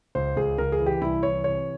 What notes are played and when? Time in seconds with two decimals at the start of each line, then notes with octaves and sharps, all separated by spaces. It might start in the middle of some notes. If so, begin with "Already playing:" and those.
0.15 C#2 C5
0.36 C#2 G#4
0.58 C#2 A#4
0.72 G#4
0.80 E3
0.86 G4
1.02 C2 E4
1.23 E3 C#5
1.44 C3 C#5